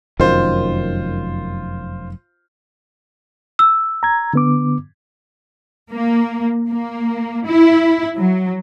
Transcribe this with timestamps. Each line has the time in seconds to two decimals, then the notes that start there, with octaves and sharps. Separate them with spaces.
0.20 F1 F#2 D#3 F4 C5
3.59 E6
4.03 A#5 G#6
4.34 D3 B3 D6
5.92 A#3
6.69 A#3
7.46 E4
8.18 F#3